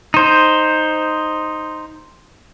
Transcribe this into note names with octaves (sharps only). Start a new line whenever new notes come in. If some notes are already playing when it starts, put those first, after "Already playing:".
D#4 C5